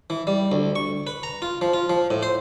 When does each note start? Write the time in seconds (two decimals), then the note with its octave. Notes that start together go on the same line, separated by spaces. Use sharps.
0.10 E3
0.27 G3
0.52 D2
0.76 C#6
1.07 B4
1.23 A#5
1.42 F4
1.61 F3
1.73 F4
1.90 F3
2.10 A2
2.23 C5